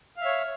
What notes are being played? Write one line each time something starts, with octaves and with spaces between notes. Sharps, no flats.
C#5 E5 F5